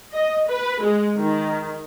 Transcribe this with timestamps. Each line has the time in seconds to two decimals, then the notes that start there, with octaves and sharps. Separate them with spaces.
0.14 D#5
0.48 B4
0.82 G#3
1.18 D#3